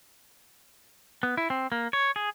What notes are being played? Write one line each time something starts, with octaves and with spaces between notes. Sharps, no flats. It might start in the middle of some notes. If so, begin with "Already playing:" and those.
B3
E4
C4
A#3
C#5
G#4